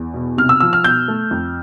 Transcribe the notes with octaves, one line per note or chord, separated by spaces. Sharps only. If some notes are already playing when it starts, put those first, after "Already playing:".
Already playing: E2
B2
C3 F6
E6
F3 E6
F6
B2 G6
A3
F2